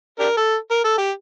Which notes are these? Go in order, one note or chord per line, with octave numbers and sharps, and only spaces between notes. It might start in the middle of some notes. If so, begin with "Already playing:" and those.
D4 G4 A#4
A4
A#4
A4
G4